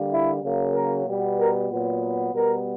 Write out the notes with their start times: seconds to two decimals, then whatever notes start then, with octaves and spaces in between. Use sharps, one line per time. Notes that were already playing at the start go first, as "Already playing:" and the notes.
Already playing: D3 G3 A#3
0.11 E4
0.42 C#3 F#3 A#3
0.74 A#4
1.05 B2 G3 B3
1.37 A#4
1.69 A#2 F#3 B3
2.32 B2 G3 B3 A#4